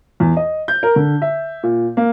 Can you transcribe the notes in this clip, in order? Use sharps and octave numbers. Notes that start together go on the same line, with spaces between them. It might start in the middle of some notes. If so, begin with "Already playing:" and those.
E2
D#5
G6
A#4
D3
E5
A#2
A#3